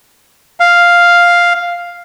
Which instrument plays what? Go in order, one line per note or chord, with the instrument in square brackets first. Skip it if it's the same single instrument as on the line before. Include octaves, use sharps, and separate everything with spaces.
[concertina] F5